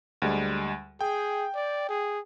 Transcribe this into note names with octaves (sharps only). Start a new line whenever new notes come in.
D2 G3 G#3
G#4 G5
D5
G#4